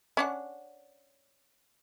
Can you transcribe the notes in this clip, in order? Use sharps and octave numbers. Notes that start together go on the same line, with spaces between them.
C#4 D4 F#5